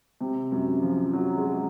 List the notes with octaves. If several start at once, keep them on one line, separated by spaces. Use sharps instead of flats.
C3
F#2
F3
F#3
G#3